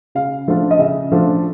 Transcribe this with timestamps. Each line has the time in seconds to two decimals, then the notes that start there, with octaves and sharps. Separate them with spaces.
0.15 C#3 F5
0.48 F3 A3 D4 F4
0.71 D#5
0.79 C#3 E5
1.12 F3 A3 D4 F4